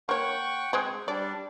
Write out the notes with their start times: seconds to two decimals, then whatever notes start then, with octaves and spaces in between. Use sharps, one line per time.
0.09 A#3 C#5 F#5 G5 C#6
0.73 G#3 C4 G#4
1.08 G3 D4 D5